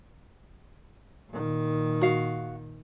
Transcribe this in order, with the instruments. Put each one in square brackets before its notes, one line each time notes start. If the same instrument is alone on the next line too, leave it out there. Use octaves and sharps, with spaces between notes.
[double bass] A#2 D#3
[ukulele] F#4 F5